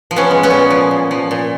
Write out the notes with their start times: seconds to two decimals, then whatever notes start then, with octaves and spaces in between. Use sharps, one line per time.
0.11 F3
0.16 B3 C#4
0.31 G#3
0.43 B3 C#4
0.50 A#2
0.70 F3
0.91 A#2
1.11 F3
1.31 A#2